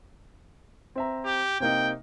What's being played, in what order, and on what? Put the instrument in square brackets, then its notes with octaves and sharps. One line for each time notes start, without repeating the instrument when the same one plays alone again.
[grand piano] C4 E5 A#5
[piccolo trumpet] G4
[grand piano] C3 A#3 D#4 [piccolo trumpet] G5